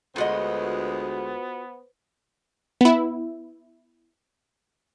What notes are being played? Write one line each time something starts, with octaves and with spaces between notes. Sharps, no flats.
D2 G#3 B3 F4 F#4 B4 C5 D#5
B3 E4